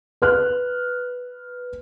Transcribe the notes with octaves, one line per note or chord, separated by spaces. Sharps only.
B4 F6 F#6